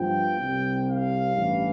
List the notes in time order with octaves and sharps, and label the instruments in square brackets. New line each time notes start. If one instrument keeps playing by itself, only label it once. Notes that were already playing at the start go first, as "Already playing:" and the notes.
Already playing: [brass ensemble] G2 F3 B3 F4 G5
C2 C3 G3
F5
A1 G2 E3